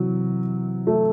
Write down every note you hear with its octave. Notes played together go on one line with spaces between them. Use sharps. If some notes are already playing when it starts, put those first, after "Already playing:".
Already playing: C3 E3 F#3
A3